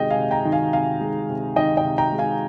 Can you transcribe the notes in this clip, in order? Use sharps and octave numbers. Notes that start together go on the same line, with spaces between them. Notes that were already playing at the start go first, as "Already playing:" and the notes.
Already playing: C3 D#3 G#3 D#5 G5
F5 G#5
C3
G5 A#5
D#3
F5 G#5
C3 F5 G#5
G#3
C3
D#3 D#5 G5
D#5 G5
C3
G5 A#5
G#3
F5 G#5